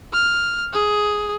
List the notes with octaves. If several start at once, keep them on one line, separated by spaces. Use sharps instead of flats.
F6
G#4